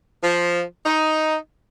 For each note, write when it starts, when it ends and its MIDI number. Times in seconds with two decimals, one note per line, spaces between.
0.23 0.61 53
0.86 1.36 63